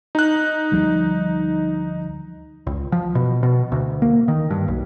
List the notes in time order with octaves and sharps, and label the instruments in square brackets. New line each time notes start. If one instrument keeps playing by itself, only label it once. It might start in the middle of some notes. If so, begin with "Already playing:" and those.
[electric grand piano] D#4 F#6
[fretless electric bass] D2 F3 G3
[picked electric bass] C#2
F3
B2
B2
D2
A#3
D#3
G2
B1